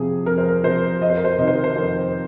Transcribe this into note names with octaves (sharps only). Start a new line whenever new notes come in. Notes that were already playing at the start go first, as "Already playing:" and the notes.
Already playing: F2 C3 F3 G#4
F2 A#4
C5
A#4
C3 F3 C5
F2 D#5
C5
A#4
C5
C3 D#3 D#5
C5
A#4
C5
F2 A#4